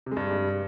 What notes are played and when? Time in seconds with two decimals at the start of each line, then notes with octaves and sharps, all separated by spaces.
0.06 C3
0.12 G#3
0.17 G2